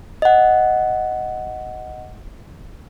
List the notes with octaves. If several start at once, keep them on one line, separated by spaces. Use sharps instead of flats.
D#5 F#5